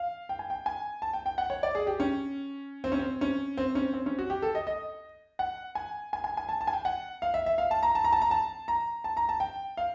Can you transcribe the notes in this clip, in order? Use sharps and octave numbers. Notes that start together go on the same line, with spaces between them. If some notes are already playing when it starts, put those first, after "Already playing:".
Already playing: F5
G5
G#5
G5
G#5
A5
G5
G5
F#5
C#5
D5
G#4
G4
C#4
C4
C#4
C4
C#4
C4
C#4
C4
C#4
F#4
G4
A4
D#5
D#5
F#5
G#5
G#5
G#5
G#5
A5
A5
G#5
G5
F#5
F5
E5
E5
F5
A5
A#5
A5
A#5
A5
A#5
A5
A#5
A5
A#5
A5
G5
F5